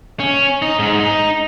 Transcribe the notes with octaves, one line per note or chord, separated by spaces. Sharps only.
C#4
D#4
G#2
D#4